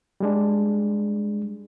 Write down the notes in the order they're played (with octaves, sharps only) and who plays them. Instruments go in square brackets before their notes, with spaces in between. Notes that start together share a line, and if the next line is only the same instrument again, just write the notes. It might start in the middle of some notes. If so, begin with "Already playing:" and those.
[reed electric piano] G3 G#3 D4